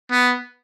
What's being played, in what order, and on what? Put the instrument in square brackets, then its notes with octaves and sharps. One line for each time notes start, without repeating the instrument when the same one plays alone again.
[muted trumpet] B3